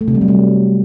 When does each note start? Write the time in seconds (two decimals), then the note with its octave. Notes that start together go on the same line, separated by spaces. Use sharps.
0.01 A3
0.08 C3
0.15 G3
0.21 F#3
0.28 G3